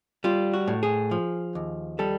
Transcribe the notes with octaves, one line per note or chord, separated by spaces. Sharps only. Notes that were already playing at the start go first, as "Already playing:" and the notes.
G3 F4
F#4
A2
G#4
F3
D#2
G3 A4